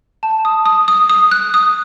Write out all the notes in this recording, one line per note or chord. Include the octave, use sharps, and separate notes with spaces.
A5
D#6
D#6
D#6
D#6
F#6
D#6